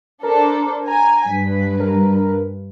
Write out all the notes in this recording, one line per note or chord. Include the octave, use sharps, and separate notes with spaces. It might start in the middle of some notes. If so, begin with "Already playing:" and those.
D4 A4 A#4 C5
G#5 A#5
G2 B4 B6
A#4